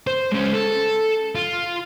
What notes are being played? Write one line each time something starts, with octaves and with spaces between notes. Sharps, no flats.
C5
G#3 C#4
A4
F4